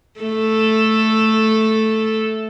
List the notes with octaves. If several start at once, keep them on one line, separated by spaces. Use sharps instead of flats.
A3 A4